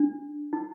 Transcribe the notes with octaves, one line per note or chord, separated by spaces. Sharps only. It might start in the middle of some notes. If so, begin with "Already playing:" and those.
Already playing: D4
D#4